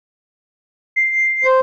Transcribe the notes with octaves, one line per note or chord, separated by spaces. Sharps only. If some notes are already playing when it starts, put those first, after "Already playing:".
C7
C5